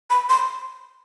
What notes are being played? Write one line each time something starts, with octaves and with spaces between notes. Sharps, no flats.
B5
C6